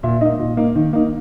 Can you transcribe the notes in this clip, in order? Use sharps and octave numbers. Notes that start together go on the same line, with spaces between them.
A#2 E5
A#3 D#4 D#5
A#2
A#3 D#4
D#3
A#3 D#4